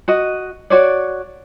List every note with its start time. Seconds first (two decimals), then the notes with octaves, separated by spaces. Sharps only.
0.08 F#4 D#5
0.70 F#4 C#5 D5